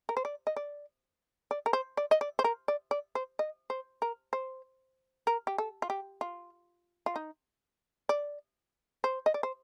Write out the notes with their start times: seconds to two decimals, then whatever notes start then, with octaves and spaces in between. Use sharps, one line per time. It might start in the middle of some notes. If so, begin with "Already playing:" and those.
0.09 A#4
0.17 C5
0.25 D5
0.47 D#5
0.56 D5
1.51 D5
1.66 A#4
1.73 C5
1.97 D5
2.11 D#5
2.21 D5
2.39 C5
2.44 A#4
2.68 D5
2.91 D5
3.15 C5
3.39 D#5
3.70 C5
4.02 A#4
4.33 C5
5.27 A#4
5.47 G4
5.58 A4
5.82 F4
5.90 G4
6.21 F4
7.06 F4
7.16 D#4
8.09 D5
9.04 C5
9.26 D#5
9.34 D5
9.43 C5